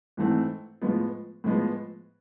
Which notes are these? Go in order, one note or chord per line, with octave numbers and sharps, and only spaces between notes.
G#2 E3 A3 C4
A2 F3 G#3 B3
A2 F3 G#3 B3